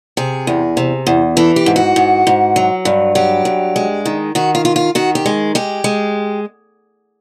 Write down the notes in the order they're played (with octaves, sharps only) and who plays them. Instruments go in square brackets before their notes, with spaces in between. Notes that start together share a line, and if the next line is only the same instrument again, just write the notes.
[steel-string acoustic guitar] C3 G#4
E2
C3
E2
E3 A4
G4
G#2
F#4
G#2
G#2
F#3
G2
F#3 G4
G2
G#3
D#3
D#3 F#4
F4
F4
F4
D#3 F#4
G4
G#3
G#3 G4
G#3